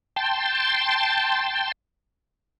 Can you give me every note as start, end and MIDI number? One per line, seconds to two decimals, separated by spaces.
0.16 1.72 79
0.16 1.72 81
0.16 1.72 84